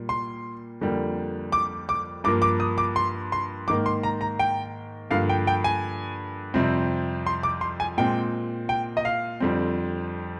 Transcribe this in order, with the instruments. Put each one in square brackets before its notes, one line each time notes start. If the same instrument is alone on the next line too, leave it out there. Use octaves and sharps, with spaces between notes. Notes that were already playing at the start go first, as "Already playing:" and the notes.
Already playing: [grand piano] A#2 G3 A#3
C6
F2 D3 G3 A#3
D6
D6
G2 F3 A#3 D6
D6
D#6
D6
C6
C6
G#2 D#3 A#3 D6
C6
A#5
A#5
G5
G2 D3 F3 A#3 F5
G5
G5
G#5
F2 C3 G3 C4
C6
D6
C6
G#5
A#2 G#3 C4 G5
G5
D#5
F5
F2 D3 G3 C4